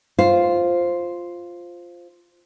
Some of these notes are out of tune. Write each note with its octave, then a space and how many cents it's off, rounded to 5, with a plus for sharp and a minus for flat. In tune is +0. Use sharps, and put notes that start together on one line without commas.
F4 +0 C5 +0